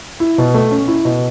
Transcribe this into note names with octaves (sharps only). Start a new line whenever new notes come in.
E4
B2
A3
C#4
E4
B2